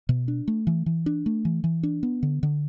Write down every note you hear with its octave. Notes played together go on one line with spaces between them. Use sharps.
B2
D4
A3
E3
E3
D4
A3
E3
E3
D4
B3
D3
D3